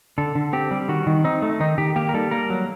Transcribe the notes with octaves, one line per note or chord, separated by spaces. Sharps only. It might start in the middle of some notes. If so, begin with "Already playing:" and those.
D3 A4
D3
C4 G4
G3
D#3 F#4
D#3
C4 D#4
A3
D#3 D#4
D#3 G4
A#3 G4
A#4
G3 A4
A#3 A#4
F#3